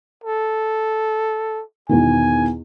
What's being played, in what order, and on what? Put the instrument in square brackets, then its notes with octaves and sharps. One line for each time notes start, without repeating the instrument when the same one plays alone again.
[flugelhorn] A4
[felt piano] E2 B2 D#3 [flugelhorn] G#5